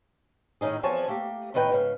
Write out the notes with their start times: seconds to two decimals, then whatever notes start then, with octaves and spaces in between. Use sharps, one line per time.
0.61 A2 D#3 C#4 D#4 G#4
0.83 E2 F3 C4 C#5 G#5 A5
1.08 A3 A#3 G4
1.54 A2 D#3 D#4 B4 G5
1.72 G#2 C#3